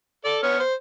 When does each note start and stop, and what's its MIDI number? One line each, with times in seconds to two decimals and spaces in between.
0.25 0.38 69
0.25 0.38 74
0.43 0.60 59
0.43 0.60 73
0.43 0.60 89
0.60 0.74 72